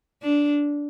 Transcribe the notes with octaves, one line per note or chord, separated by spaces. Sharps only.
D4